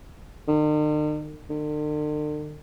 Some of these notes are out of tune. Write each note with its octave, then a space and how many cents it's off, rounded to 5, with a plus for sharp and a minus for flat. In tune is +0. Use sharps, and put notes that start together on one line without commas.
D#3 -45
D3 +45